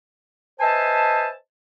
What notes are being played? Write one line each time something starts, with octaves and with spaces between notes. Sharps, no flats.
B4 C5 D#5 E5 G#5 A5